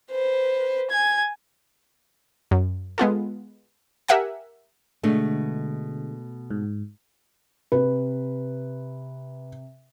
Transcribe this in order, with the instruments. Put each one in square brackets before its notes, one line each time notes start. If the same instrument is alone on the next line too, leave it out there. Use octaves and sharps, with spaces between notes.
[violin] B4 C5
G#5 G#6
[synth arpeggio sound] F#2
G#3 B3 F4 A4
G4 A#4 E5 F#5 G#5
[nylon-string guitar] B2 A3 [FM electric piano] D3 G#3
[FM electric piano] G#2
[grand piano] C3 [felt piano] B4